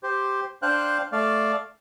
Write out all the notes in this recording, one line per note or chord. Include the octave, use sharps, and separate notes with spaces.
G4 C5
D4 C5 F5 G5 F#6
A3 D5 F5